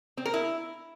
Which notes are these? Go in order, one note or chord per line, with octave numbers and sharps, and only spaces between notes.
C4
A#4
E4